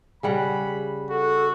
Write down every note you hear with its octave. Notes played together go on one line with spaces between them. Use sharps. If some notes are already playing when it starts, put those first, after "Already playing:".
C#3 G3 F#5 B5
F#4 A4